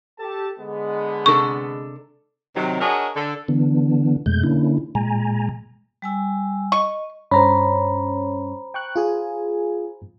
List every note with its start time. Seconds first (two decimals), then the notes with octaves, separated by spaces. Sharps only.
0.19 G4 A4 A5
0.59 D3 G#3 B3
1.26 C3 D4 A4 C#6
2.56 C3 D#3 F#3
2.81 D4 F#4 G#4 A#4 C#5 D#5
3.16 D3 A4
3.48 D3 E3 B3 D4
4.26 F2 B2 G#3 A3 G6
4.43 D3 A#3 C#4 D4 E4
4.95 A#2 G#3 G#5 A#5
6.02 G3 G#5 E6
6.72 D#5 C#6
7.31 G2 C#4 C5 C#5 A#5 B5
8.74 G5 C#6 F#6
8.96 F4 G#4 G#5